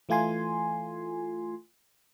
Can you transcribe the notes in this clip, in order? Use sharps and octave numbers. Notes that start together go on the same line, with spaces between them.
E3 A3 F4 G#5 C6